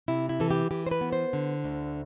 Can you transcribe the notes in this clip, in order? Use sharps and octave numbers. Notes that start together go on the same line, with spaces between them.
C3 E4
E4
E3 A4
G4
E3 G4
C5
B4
B3
C5
D3
D2